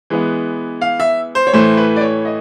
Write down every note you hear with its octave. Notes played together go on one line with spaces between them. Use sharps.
E3 G#3 B3
F5
E5
C5
C#5
A2 E3 A3 C5
B4
D5
C#5
D#5